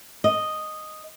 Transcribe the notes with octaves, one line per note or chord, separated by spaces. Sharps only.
D#5